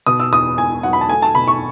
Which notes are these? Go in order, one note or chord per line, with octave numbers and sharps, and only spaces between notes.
B2 D#6
E6
E2 D#6
E1 G#5
F#3 F#5
B5
A5
A3 G#5
A5
B2 B5
C#6